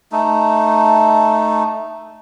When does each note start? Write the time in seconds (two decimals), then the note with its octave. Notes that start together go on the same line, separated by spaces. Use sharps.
0.12 A3 D#4